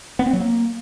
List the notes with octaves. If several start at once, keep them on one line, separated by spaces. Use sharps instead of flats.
B3
C4
F#3
A#3